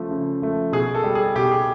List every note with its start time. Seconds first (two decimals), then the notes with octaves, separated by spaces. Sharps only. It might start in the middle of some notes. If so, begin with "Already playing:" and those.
Already playing: C#3 F3 A3
0.11 C#3
0.42 F3 A3
0.73 B2 G#4
0.95 A4
1.04 G3
1.15 G#4
1.36 B2 G4
1.51 G#4